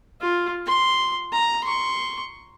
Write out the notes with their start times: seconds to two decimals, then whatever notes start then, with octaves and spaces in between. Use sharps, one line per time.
0.21 F4
0.67 C6
1.33 A#5
1.64 C6 C#6